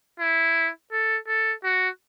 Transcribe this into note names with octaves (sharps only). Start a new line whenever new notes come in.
E4
A4
A4
F#4